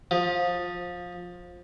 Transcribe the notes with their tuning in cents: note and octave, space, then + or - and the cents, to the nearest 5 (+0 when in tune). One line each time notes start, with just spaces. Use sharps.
F3 +20